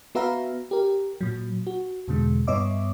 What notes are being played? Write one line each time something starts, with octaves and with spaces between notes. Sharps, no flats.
B3 F#4 B4 E5 F5 A#5
G4 A#4
A#2 F#3
F#4
E2 B2 D3 G#3
G2 B3 C#5 D#5 E5 D6